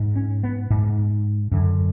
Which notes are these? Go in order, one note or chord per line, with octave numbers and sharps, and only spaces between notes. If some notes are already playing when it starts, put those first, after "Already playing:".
Already playing: G#2
C#4
B3
G#2
F#2 D3